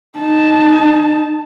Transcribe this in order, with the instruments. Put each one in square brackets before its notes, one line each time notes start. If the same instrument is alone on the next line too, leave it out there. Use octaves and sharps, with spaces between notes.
[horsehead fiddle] D#4 A5